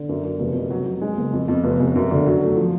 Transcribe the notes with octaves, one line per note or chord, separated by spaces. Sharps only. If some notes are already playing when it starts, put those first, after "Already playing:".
Already playing: D3
F#2
F#2
F1
F2
F#3
F#3
G#3
F#1
F2
F2
F1
F1
F#2
D3
F#3
A3
F3